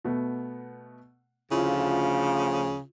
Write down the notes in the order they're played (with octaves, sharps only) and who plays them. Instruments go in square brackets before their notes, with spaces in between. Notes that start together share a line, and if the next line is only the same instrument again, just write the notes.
[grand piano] B2 A3 B3
[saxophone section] D2 F3 [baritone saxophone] C#3 [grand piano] E4 F4